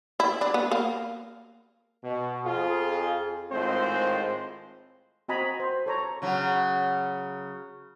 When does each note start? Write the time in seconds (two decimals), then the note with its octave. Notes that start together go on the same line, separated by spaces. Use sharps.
0.20 E4
0.41 D4
0.54 B3
0.72 A#3
2.03 B2
2.44 F2 F4 G#4
3.51 G#1 A2 G#3 C4 F4 C5
5.28 C4 F#4 D#5 G#5 A#5 B5
5.60 C5
5.86 A4 C#5 A#5
6.22 C#3 F#3